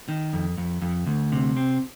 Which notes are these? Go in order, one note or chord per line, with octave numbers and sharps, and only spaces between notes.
D#3
F2
F2
F2
D2
C3
C4